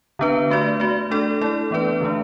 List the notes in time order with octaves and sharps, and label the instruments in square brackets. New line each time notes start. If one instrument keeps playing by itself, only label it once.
[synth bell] D3 B3 D4 B4
A3 F#4 D5
A3 F#4 D5
A3 D4 A4 D5
A3 E4 A4 D5
E3 B3 D4 B4 D5
D3 A3 D4